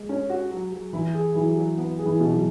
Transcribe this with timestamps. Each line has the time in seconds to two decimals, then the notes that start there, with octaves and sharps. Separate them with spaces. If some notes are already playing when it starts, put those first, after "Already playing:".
Already playing: G#3
0.09 C#4
0.30 F#4
0.51 F#3
0.72 F#3
0.93 E3 E4
1.14 G#4
1.35 E3 F#3
1.56 F#3
1.78 B3
1.99 G#4
2.06 E3
2.20 B2
2.33 F#3